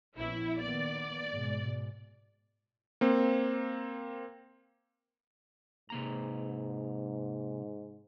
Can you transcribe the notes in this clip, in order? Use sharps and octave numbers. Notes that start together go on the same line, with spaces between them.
A#1 B3 C#4 E4
D#3 A#3 B3 D5
G#2 B2 G#3
A#3 C4
G#2 C3 A#3 A#5